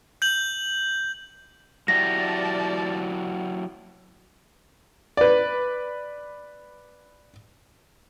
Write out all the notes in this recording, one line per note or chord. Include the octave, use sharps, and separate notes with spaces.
G6 F#7
F#3 E4 G4 D5 A5 A#6
B4 D5